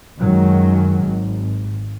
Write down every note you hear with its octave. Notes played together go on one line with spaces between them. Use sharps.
F#2 D#3 F#3 G#3
G#1